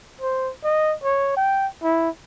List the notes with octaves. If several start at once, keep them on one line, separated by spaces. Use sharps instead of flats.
C5
D#5
C#5
G5
E4